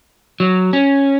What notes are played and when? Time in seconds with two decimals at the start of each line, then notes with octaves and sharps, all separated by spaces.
0.40 F#3
0.73 C#4